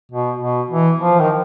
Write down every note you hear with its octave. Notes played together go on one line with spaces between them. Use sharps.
B2
B2
E3
F3
D#3